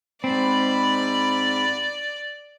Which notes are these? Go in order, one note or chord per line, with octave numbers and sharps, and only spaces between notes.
G#2 C4 D5 B5